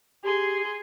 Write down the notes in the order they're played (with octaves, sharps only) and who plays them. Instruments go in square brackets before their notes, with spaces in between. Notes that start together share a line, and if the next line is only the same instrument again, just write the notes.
[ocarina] G4 [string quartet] G#4 C6